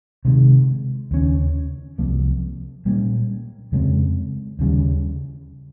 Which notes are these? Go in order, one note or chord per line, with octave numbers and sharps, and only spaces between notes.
C3 D#3 G#3
D#2 C#3 G3 C#4
C2 C3 F3 A#3
A#2 G3 A#3 C#4
F2 C#3 G#3 C4
D#2 C#3 G3